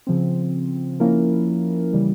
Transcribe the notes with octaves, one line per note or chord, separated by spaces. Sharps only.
C#3 F3 C4
F3 A#3 C#4 E4 A#4
C#3 E3 G3